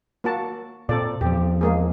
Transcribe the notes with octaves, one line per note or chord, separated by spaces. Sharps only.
A#3 F#4 A5
A#2 C4 A4 D5
E2 F3 G4
G#3 A#3 G#4